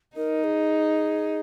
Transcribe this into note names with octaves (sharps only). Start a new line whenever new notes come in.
D#4 A#4
G#4